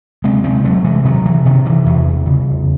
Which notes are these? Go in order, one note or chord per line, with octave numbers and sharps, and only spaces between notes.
C3 G#3 C4
G#3 C4
C3 F#3 A3
E3 G#3
C3 D#3 F#3
E3
C3 D#3
E3
E2
C#3